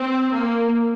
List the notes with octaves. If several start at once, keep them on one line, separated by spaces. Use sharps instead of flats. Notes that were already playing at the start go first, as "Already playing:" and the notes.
Already playing: C4
A#3